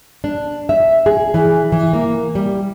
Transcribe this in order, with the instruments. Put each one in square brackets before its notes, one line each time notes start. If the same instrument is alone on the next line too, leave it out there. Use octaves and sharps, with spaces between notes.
[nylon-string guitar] D4
E5
G#4
E3
E3
A#3
G3